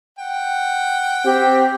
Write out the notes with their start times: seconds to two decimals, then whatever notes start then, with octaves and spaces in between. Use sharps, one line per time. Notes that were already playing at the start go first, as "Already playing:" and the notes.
0.18 F#5 G5
1.25 C4 G4